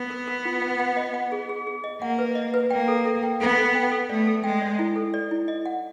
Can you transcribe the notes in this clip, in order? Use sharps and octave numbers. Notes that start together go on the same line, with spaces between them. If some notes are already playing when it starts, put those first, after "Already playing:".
Already playing: B3
A#4
A#4
F4
F#5
F#5
D#5
F#5
G#4
G#4
G#4
D#5
A#3 F#5
B4
D#5
B4
A#3 G5
A4
A4
G5
B3 A4
A4
G5
A4
A3 D5
A4
G#3 G5
D5
E4
A4
D5
E4
D#5
F#5